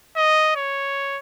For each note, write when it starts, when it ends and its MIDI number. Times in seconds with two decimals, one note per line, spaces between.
0.16 0.51 75
0.56 1.19 73